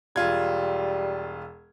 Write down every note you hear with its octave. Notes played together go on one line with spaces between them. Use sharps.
E1 G3 F4 G#6